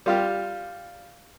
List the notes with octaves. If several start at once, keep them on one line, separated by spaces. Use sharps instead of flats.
G3 F4 G4